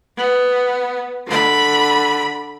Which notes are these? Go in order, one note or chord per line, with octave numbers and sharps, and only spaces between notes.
B3
D3 B5